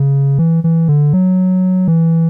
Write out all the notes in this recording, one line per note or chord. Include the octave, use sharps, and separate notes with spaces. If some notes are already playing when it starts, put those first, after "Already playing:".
Already playing: C#3
E3
E3
D3
F#3
E3